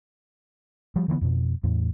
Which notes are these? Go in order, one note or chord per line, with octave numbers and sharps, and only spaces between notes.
F3 G3
D3 E3 A#3 B3
F2 B2
E2 A2